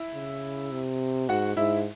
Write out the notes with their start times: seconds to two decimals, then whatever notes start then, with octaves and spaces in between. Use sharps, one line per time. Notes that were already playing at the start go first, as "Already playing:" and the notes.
Already playing: E4
0.14 C#3
0.72 C3
1.29 G#2 F#4 F#5
1.57 G#2 E4 E5